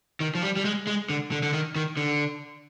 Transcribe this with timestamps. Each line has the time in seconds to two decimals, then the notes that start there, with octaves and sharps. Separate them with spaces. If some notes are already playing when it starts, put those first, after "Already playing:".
0.20 D#3
0.35 F3
0.43 G3
0.56 G3
0.65 G#3
0.87 G#3
1.09 D3
1.31 D3
1.43 D3
1.53 D#3
1.76 D#3
1.97 D3